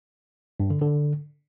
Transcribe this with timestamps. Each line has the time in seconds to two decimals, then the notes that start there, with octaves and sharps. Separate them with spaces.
0.60 G2
0.70 D3
0.81 D3